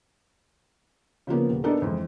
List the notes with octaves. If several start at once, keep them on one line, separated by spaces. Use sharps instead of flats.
C#3 F3 A#3 B3
D#1
B3 D4 D#4 A4 A#4
F2 E3 G#3